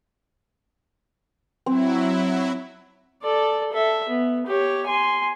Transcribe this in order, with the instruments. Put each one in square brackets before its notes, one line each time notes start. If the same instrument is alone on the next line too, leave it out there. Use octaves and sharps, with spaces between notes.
[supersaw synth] F#3 E4 [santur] C4
[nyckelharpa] A4 D5
A4 E5
B3
G4 C#5
G#5 C6